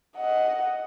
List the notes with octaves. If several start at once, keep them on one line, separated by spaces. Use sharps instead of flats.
D#5 F#5